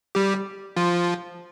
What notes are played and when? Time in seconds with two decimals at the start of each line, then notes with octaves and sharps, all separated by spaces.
0.15 G3 G4
0.76 F3 F4